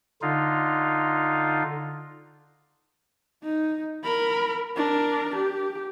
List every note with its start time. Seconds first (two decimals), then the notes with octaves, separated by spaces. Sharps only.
0.22 D3 D#4 F4
3.43 D#4
4.04 A#4 B5
4.76 D4 A#4
5.35 G4